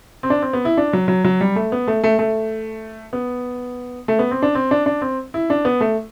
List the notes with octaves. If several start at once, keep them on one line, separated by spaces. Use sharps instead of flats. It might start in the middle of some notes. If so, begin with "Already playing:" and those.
C4
D4
C4
B3
E4
D4
F#3
F#3
F#3
G3
A3
B3
A3
A3
A3
B3
A3
B3
C4
D4
C4
D4
D4
C4
E4
D4
B3
A3